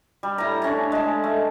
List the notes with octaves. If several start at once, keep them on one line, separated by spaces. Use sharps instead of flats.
G3
A2 A#5
A2 C#4 D4
G#3 A5
A3